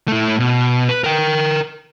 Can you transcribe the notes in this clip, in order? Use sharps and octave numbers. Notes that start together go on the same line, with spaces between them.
A3 E4
B2
B4
A#4 G5